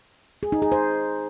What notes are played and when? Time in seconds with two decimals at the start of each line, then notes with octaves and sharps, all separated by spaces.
0.43 G#4
0.52 D#4
0.62 G#4
0.72 C5